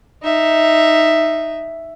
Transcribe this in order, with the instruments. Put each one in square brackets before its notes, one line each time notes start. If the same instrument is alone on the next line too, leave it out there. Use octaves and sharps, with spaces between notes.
[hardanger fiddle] D#4 E5